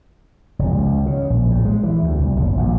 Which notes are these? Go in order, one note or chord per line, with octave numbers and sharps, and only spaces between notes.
F1
C#2
C#3
A#1
A2
G#3
E3
D2
C2
F#1
A#1